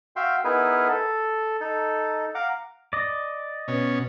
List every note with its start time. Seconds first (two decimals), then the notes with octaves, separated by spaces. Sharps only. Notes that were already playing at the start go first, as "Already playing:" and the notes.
0.16 F#4 E5 F5 G5 C6
0.45 B3 D#4 E4 G#4 A#4 B4
0.88 A4
1.61 D#4 A4
2.35 F5 F#5 A#5 D6
2.93 D5 D#5
3.68 B2 C#4